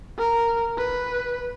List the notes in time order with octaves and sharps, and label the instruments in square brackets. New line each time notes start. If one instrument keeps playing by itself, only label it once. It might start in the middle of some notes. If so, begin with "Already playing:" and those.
[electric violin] A#4
B4